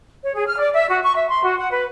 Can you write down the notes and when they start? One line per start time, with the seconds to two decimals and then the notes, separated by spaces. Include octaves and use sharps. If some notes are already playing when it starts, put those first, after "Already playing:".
0.23 C#5
0.34 G#4
0.47 F6
0.59 D5
0.73 E5
0.89 F#4
1.02 C#6
1.15 E5
1.28 C6
1.43 F#4
1.58 F#5
1.71 B4